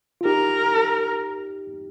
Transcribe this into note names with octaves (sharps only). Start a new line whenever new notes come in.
F4
D#4 G4 A#4